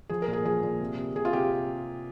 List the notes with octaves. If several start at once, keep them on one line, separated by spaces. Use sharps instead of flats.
F3 G#4
A#4
A#2
G#4
F3 G#4
A#2
C3
C3
C3 G#4
F4
C3 G4